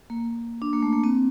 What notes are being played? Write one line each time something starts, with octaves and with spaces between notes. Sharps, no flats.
A#3
D4
A#3
A3
A#3
C4